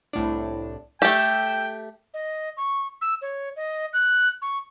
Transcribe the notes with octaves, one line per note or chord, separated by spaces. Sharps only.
C2 A2 D4
A3 G4 G5 E6
D#5
C#6
E6
C#5
D#5
F#6
C#6